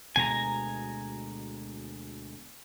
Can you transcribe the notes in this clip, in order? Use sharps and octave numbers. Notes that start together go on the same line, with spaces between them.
D2 B2 G#3 G#5 A#5